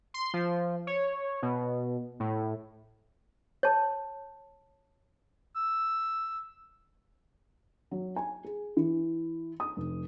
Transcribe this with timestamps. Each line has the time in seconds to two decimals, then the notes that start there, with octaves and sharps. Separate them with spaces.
0.14 C6
0.34 F3
0.87 C#5
1.42 B2
2.20 A2
3.63 C#5 A5
5.56 E6
7.91 F#3
8.16 G#5
8.44 G#4
8.77 E3
9.60 D#6
9.77 F1